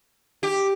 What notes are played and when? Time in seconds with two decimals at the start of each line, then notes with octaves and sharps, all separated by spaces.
0.43 G4